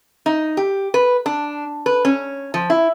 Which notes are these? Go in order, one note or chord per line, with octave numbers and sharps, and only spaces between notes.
D#4
G4
B4
D4
B4
C#4
F3
E4